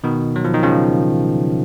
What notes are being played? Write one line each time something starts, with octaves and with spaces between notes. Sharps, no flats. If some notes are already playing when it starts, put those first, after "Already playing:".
B2 D#3
F#3
F3
D#3
C#3 F3